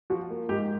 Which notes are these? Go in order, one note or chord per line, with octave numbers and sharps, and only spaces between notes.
F3 F#4
A#3
G#2 G4